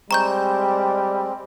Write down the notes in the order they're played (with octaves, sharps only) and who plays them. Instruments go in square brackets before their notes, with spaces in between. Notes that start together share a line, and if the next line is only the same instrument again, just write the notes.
[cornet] G3 [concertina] G#3 C4 [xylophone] A#5 C#6 G6